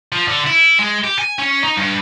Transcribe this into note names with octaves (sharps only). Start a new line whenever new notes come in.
F3
D3
E4
G#3
G4
G#5
C#4
D#4
G2